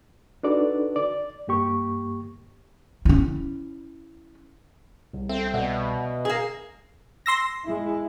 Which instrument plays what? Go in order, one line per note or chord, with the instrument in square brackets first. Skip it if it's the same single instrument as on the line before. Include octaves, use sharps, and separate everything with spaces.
[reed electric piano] D4 D#4 F#4 A4 B4 D5
D5
G2 A#3 G4 C#6
[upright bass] C#4 E4
[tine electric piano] C2
[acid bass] C4 [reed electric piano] A4 E5 G5
[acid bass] B2 [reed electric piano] D5 E5 F#5
[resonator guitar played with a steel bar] A#3 G#4
[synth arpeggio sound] C6 E6 A#6
[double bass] G#3 E4